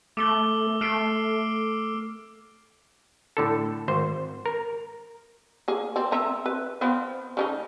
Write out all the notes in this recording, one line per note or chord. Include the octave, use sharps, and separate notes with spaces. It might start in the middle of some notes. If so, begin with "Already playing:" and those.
A3 D6 E6 G7
A3 F6 C7 D7
A2 D3 A4
G#1 C5
A#4
A#3 G#4
C4 D5
C4 E5 A#5
B4
F3 B3 C4
C#3 C#4 D#4